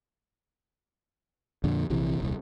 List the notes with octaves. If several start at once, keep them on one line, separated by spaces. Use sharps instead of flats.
F2 A#2 D3
A#1 C3 E3
D#1 C2